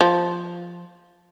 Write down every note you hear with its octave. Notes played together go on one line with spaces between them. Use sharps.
F3